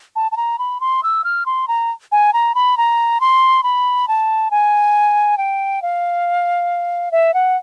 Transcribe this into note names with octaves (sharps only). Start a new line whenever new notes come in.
A5
A5
A#5
B5
C6
E6
F6
C6
A#5
G#5
A#5
B5
A#5
C6
B5
A5
G#5
G5
F5
E5
F#5